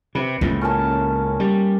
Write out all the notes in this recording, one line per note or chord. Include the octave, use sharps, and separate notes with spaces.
C3 B4
C#2 A2 A#3
C#4 A#4 A5
G3